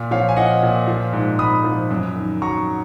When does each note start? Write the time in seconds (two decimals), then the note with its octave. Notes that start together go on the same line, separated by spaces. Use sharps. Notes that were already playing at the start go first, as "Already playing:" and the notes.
Already playing: A#2
0.11 F3 C#5 F5
0.29 G#5
0.37 F3 D#5 F#5
0.63 A#2
0.88 F3
1.13 G#2
1.39 G#2 B5 D#6
1.64 F3
1.91 F#2
2.16 D#3
2.42 F#3 A#5 C#6